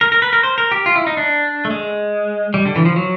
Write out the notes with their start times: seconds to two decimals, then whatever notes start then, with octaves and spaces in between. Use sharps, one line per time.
0.01 A#4
0.12 A#4
0.22 B4
0.33 A#4
0.43 C5
0.58 A#4
0.72 G4
0.86 F4
0.96 E4
1.07 D#4
1.17 D4
1.65 A3
1.70 G#3
2.54 G3
2.65 D3
2.76 E3
2.85 F3
2.96 F#3